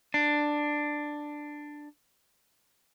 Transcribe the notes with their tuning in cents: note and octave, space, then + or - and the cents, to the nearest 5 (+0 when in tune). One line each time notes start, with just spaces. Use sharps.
D4 +10